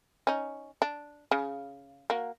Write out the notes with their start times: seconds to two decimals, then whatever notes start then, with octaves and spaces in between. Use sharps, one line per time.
0.27 C#4 D#4
0.82 D4
1.31 C#3
2.10 A#3 F#4